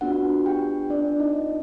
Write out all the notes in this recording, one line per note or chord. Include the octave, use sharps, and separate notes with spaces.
B3 D4 F4 F#4 F#5
G4 G5
D4 D5
D#4 D#5